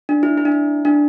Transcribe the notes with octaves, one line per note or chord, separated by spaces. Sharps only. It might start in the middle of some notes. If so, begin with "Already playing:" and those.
D4
E4
E4
D4
E4
D4